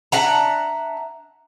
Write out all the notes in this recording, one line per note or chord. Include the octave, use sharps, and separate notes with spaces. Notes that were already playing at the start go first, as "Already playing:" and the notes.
D4 E5 F#5 A#5